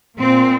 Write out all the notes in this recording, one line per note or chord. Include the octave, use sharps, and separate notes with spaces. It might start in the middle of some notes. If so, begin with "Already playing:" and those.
A#2 C4